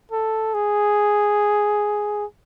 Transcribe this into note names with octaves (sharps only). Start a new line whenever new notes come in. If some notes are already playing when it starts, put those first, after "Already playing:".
A4
G#4